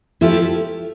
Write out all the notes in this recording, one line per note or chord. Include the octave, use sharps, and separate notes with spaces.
F3 A3 E4 G4